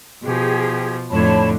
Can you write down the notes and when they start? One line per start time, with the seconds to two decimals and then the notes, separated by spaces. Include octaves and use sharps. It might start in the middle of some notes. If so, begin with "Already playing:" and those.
0.23 B2 F3 G4 G#4
1.10 F2 A2 D3 C#5 A5 B5